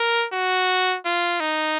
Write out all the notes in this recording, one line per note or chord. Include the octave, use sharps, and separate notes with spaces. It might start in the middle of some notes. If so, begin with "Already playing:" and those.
Already playing: A#4
F#4
F4
D#4